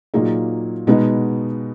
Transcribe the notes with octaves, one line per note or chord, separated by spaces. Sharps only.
A#2 F#3 A#3 D#4 G#4
B2 G#3 B3 D#4